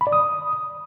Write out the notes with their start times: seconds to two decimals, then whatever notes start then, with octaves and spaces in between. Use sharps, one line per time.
0.01 B5
0.07 D5
0.12 D#6